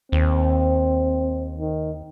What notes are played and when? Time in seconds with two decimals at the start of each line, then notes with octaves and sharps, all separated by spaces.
0.12 D#2 C4
1.58 D#3